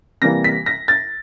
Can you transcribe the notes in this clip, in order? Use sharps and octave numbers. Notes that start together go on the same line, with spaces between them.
C3 E3 G3 A#3 A#6
B6
A#6
A6